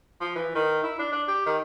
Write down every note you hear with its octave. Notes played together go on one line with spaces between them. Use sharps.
F3
E3
D#3
E4
D4
D4
G4
D#3